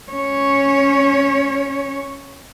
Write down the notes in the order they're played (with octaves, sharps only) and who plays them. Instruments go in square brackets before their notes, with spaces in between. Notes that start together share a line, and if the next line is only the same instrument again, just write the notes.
[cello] C#4 C#5